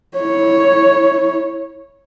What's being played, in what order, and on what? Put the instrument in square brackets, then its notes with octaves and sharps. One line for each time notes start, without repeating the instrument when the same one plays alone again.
[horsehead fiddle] E4 C#5